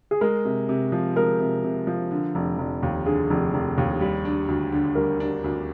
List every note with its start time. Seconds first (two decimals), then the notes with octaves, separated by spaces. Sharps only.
0.11 G#4
0.21 G#3 A#4
0.45 C3
0.69 C3
0.92 F3
1.16 G#3 A#4
1.40 C3
1.64 C3
1.87 F3
2.11 D3
2.35 F1
2.58 F1
2.83 D#2
3.06 D3 G#4
3.30 F1
3.54 F1
3.78 D#2
4.01 G3
4.25 D4
4.48 D2
4.72 D3
4.95 G3 A#4
5.20 D4
5.44 D2